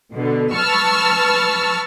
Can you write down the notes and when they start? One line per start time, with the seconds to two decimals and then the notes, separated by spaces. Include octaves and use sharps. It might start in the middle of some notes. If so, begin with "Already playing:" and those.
0.13 B2 D3
0.54 B4 A5 C#6 E6 F6